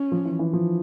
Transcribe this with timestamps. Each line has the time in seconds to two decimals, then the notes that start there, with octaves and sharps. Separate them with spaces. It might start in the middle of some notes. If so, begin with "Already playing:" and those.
Already playing: C#4
0.11 F3
0.25 E3
0.39 E3
0.53 F3